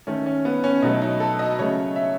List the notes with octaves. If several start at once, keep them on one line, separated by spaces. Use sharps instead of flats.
D#3 A3 C#4
C#4
B3
C#4
B2 F#3 A3 D#4
D#4
A4
D#5
C#3 F#3 A3 C#5
E5